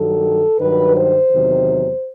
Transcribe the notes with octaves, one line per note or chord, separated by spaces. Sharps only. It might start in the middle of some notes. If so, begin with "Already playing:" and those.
Already playing: G2 D#3 F#3 A4
G2 D#3 F#3 B4
C5
E2 C3 D#3 F#3